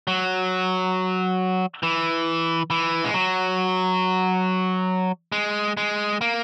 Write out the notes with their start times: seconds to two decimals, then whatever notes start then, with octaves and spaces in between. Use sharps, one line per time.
0.08 F#3
1.83 E3
2.70 E3
3.04 G#3
3.14 F#3
5.32 G#3
5.77 G#3
6.21 A#3